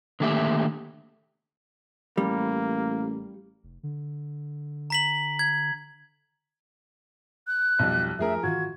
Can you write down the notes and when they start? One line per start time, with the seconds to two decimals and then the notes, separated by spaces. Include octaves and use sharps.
0.20 D3 D#3 A3 A#3 G4 E5
2.17 A1 G3 A#3
3.63 F1
3.83 D3
4.90 A#5 B6 F#7
5.39 G#6
7.47 F#6
7.79 B1 F2 G#2 B2 F3 G3
8.19 F2 F3 A3 D4 G#4 A#4 E5
8.43 G#2 D#3 E3 F4 F#4 G#6